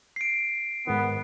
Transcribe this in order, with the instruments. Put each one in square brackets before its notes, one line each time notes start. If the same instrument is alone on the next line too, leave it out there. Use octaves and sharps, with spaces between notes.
[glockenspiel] C7 D7
[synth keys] G#2 D#3 [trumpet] B3